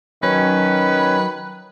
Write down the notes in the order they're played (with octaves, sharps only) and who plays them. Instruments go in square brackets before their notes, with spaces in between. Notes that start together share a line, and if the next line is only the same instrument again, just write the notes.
[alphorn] D#3 [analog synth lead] F#3 [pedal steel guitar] C#4 [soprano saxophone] B4